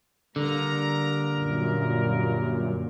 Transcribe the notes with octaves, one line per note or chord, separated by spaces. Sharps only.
D3 G3 A#3 A#4 A#5
F#2 A#2